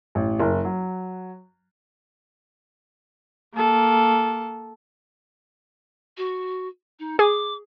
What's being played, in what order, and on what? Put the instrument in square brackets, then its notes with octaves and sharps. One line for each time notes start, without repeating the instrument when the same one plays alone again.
[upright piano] A1
F#1
F#3
[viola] A#3 A4
[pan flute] F#4
D#4
[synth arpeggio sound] G#4 [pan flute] D6